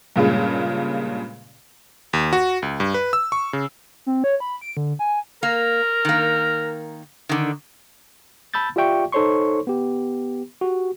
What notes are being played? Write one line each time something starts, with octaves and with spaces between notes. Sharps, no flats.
G2 A#2 C#3 G#3
D#2
F#4
C#2
G2
B4
E6
C#6
C#3
C4
C#5
B5
D7
D3
G#5
A#3 A#4
D#3 A#3
D3 D#3
A5 B5 E6 G6 A6
F4 G4 D5 E5 G5 C#6
D#4 A4 C5 C#5 C6 C#6
B3 G4
F#4 G4